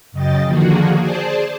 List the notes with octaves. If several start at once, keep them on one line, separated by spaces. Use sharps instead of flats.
F#2 C#3 D#5 G5 A6
D3 D#3 F3 A#3 F#4 G#4
G#4 C5 D5 A5